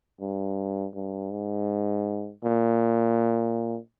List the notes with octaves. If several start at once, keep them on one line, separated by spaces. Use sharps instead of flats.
G2
G2
G#2
A#2